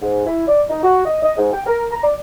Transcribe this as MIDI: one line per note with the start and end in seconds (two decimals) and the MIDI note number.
0.02 0.25 44
0.27 0.44 64
0.48 0.63 74
0.70 0.82 63
0.83 1.04 66
1.06 1.17 75
1.23 1.33 75
1.37 1.49 44
1.53 1.62 79
1.66 1.84 70
1.91 2.00 82
2.04 2.15 74